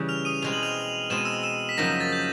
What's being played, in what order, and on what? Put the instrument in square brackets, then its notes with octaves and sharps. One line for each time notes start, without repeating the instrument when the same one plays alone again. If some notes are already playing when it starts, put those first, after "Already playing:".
Already playing: [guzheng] C#3 E3 G3
[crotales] F6 F7
D#6 D#7
[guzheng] B2 G#3 C4 [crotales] F7
[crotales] F#7
F6 F7
[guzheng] B2 G#3 C4 [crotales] E7
[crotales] D#7
E6 E7
E6 E7
B6
[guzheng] F#2 C#3 F3 A#3 D#4 [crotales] A#6
[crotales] A6
G6